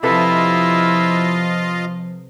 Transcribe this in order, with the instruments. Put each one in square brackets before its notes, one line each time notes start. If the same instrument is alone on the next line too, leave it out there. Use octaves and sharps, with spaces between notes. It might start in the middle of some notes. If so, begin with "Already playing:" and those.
[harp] C3 A4 B4 [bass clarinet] F3 [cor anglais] E4 [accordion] F4 D#5 F5